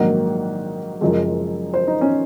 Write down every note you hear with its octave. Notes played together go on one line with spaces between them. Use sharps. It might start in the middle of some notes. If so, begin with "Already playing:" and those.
Already playing: A#1 G#2 D#3 F#3 A#3 F#5
F#1 F#2 F3 G#3
C5
D#4
C#4